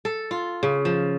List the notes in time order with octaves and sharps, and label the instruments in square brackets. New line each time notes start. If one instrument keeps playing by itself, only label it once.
[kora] A4
F4
C#3
F3